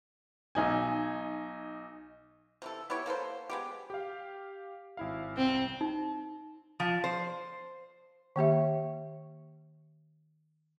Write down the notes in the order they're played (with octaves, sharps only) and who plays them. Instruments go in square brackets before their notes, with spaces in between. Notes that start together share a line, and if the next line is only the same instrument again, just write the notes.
[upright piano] B1 D#4 G#5
[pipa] C3 E3 A4
B3 E4 G4 C#5
A#3 A4 B4 C5
G#3 B3 G4
[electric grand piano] G4 F5
G#1 E4 F5
[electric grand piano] C2 [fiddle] C4
[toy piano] D#4
[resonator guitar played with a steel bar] F3
C5
[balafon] D#3 A#3 G4 E5